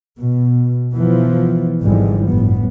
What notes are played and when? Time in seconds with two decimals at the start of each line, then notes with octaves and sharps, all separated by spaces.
0.23 B2
0.95 B2 E3 F3 B3
1.83 G#1 D3 E3 F3 G3 G#3
2.28 G1 F#2 A2 B3